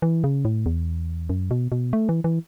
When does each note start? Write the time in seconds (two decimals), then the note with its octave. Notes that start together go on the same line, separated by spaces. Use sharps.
0.02 E3
0.24 C#3
0.45 A2
0.66 E2
1.30 F#2
1.51 B2
1.72 B2
1.93 A3
2.09 E3
2.24 E3